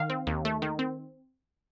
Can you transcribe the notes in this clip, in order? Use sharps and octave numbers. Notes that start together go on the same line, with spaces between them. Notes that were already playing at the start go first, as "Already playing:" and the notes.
Already playing: D#3 F5
C4
D#2
A3
D#3
C4